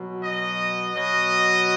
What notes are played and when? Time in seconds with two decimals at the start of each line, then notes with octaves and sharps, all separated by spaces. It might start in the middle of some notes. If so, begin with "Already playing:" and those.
Already playing: B2 F#3
0.21 D#5
0.93 B2 F#3 D#5